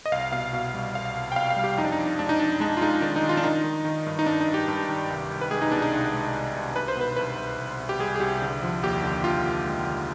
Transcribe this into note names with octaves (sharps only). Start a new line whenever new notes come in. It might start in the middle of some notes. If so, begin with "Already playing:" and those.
D#5
C2 F5
B2 F5
B2
G3
C2 F5
C2
G5
C2 F5
F5
G3
G4
F2 D#4
D4
D#4
F2
G#3 D4
D#4
F2 D4
G#3 D4
F4
G#3 D#4
D#3 D4
D#4
D#3
F4
D4
D#3 D#4
D#3
D#3
G2
D#4
G2 D4
D#4
G2
G4
G2
D#3
C2
C2
B4
G#3 G#4
D#4
B2 D4
D#4
C2
G#3
C2
C2
C2 B4
C5
B2 B4
C2 B4
C2
C2
C2
G4
G3 G#4
G#4
C2 G4
D3
F3
D#2 G4
D3
D#2 F4
D3
G#3
D3